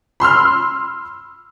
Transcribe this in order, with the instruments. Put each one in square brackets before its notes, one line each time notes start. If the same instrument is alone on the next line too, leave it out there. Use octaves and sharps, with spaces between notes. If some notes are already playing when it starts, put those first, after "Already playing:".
[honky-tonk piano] B5 C6 E6 F6